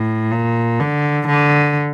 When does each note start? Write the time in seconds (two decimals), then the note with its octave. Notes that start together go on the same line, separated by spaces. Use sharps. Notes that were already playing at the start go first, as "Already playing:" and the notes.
Already playing: A2
0.32 A#2
0.79 D3
1.27 D3